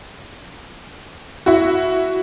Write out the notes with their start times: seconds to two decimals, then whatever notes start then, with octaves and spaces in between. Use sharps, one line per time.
1.46 E4 F#4